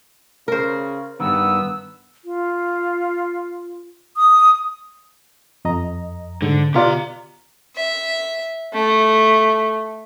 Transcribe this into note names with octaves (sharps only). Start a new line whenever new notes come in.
C#3 A#4 C5
G2 D#3 B3 E6
F4
D#6
F2 D#5 A#5
G#2 D3
B2 F4 G4 D5 A#5
E5
A3